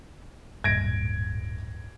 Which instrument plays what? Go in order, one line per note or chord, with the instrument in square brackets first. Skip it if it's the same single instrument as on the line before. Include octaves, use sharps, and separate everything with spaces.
[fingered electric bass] D1 G2 A#2 [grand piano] G#6 A#6 D7